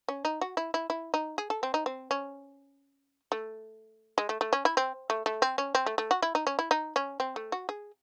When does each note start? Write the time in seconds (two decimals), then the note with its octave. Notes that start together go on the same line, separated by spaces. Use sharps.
0.08 C#4
0.25 D#4
0.41 F#4
0.57 E4
0.74 E4
0.90 E4
1.14 D#4
1.38 G#4
1.50 A4
1.63 C4
1.74 D#4
1.86 C4
2.11 C#4
3.32 A3
4.18 G#3
4.29 A3
4.41 A3
4.53 C#4
4.65 E4
4.77 C4
5.10 A3
5.26 A3
5.42 C4
5.58 C#4
5.75 C4
5.86 A3
5.98 A3
6.11 F#4
6.22 E4
6.35 D#4
6.47 C#4
6.59 E4
6.71 D#4
6.96 C#4
7.20 C4
7.36 A3
7.52 F#4
7.69 G#4